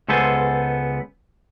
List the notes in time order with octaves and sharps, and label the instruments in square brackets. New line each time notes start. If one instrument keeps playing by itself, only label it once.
[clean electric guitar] C#2 G#3 B3 A4 C5 G#5